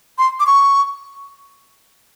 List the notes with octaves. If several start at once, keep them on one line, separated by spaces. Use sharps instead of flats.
C6
D6
C#6